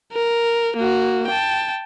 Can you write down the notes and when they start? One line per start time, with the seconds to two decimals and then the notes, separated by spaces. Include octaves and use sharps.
0.13 A#4
0.77 A#3 F#4
1.27 G5 A5